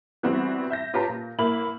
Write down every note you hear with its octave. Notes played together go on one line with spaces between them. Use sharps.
E3 G3 B3 C4 F#4
E5 G6 A#6
C#4 F4 G4 B4 A5 A#5
A#2
A1 A#3 E4 B5 F#7